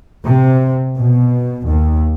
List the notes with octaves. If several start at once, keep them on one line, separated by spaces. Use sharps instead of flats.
C3
B2
D#2